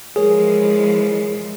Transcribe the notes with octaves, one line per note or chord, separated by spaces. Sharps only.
E3 F3 G#3 G#4 A#4 C#5